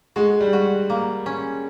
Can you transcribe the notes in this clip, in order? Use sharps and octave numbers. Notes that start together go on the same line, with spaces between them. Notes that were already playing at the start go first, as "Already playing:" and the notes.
G#3 F#4
G3
F#4
A#3
C#4